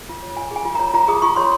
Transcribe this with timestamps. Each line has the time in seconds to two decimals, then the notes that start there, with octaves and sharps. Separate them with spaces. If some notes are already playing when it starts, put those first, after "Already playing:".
0.09 F4
0.23 C#5
0.37 F4 G#5
0.51 G#4
0.56 G#5
0.65 F4
0.75 C#5 A#5
0.94 F4 A#5
1.08 G#4 D#6
1.22 F4 C#6
1.36 C#5 C6